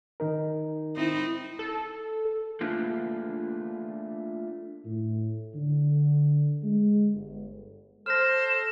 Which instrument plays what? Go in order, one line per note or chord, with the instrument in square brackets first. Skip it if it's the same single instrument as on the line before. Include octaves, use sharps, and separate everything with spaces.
[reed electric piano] D#3 D#4 A#4
[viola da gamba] C4 D#4 E4
[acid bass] A4
[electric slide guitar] A3 A#3 D4 F4
[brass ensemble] A2
D3
G#3
G1
[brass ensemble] A4 C5 [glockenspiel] F6 A#6 [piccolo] E7